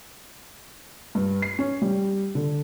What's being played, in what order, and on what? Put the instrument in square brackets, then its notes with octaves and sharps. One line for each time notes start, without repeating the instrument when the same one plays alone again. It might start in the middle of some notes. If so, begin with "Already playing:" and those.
[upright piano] G2
C7
C#4
G3
D3